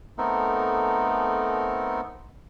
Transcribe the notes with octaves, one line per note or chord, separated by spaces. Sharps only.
A3 B3 C4 D#4 A4 A#4